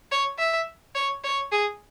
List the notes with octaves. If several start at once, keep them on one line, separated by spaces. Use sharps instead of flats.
C#5
E5
C#5
C#5
G#4